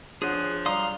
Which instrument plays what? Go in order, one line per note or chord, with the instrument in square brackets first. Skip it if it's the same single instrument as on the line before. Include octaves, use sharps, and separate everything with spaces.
[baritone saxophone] F3 [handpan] D4 C#5 F#5 [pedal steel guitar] G#4 [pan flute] F#6
[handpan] F#3 G3 D5 [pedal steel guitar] F5 C6 D#6 [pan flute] A#5